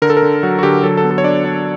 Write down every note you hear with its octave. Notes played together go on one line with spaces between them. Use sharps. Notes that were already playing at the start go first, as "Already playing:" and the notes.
D3 A#4
A4
A#4
D3
F#3 F#4
F#4
D3 G4
F#3 A4
A4
B3
A4
C#5
D4 D5
D4